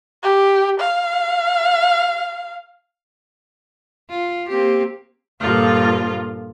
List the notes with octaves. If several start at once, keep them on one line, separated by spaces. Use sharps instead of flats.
G4
F5
F4
A#3 C4 G4
G2 A#2 D3 F3 F4